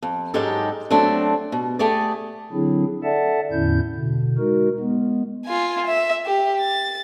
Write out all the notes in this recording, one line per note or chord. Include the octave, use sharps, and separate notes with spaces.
F2
G#2 F#3 G#3 D#4 G4 A4
F#3 A3 C4 D4
B2
A3 G4 G#4 D5
D3 F#3 C4 D4 E4 G#4
A4 D5 E5 F#5 A5
E2 A2 D3 C#4 E4 G6
B2 D3
G#3 D#4 F#4 A#4
G#3 B3
F4 G#5
E5
G4
A6